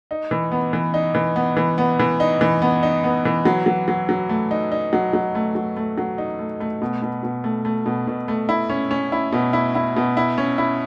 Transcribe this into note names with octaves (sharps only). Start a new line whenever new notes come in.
D#4
E3
B3
E3
D#4
E3
B3
E3
B3
E3
D#4
E3
B3
D#4
B3
E3
F#3
F#3
F#3
F#3
A3
D#4
D#4
F#3
F#3
A3
F#3
A3
F#3
D#4
A3
A3
B2
B2
B2
A3
A3
B2
B2
A3
E4
C#4
C#4
E4
B2
E4
E4
B2
E4
C#4
E4